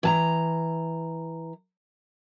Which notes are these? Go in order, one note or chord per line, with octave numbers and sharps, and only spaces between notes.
E3 A5 A#5